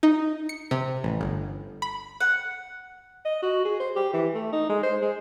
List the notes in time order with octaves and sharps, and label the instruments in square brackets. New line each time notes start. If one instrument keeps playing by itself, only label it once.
[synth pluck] D#4
C#7
C3
A1
G1
B5
[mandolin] F#5
[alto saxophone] D#5
F#4
G#4
C5
G4
E3
A3
D#4
G#3
C5
G#3